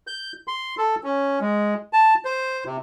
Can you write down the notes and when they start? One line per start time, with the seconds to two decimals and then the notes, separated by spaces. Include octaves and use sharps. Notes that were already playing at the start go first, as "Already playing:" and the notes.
0.07 G6
0.48 C6
0.78 A4
1.04 C#4
1.41 G#3
1.93 A5
2.25 C5
2.66 C3